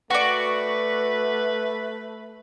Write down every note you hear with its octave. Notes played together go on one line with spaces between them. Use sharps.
A3 F#4 B4 D5